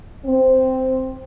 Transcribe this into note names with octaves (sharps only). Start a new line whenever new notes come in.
C4